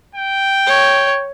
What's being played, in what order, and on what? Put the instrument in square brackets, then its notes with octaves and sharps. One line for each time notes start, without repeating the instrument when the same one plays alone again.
[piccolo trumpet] G5
[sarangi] C#5